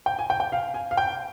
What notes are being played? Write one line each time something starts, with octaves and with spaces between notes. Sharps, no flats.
G5
G#5
G5
G5
F5
G#5
F5
G5